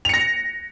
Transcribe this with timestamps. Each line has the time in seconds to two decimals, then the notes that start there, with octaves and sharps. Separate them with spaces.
0.05 F7
0.09 C#7
0.14 A#6